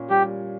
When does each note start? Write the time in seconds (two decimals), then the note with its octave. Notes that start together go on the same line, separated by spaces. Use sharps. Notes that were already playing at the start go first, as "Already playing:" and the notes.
Already playing: A#2 C#4
0.10 G3 G4